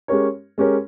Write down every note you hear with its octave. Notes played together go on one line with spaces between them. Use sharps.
G#3 C#4 G4 A#4 C#5
G#3 C#4 G4 A#4 C#5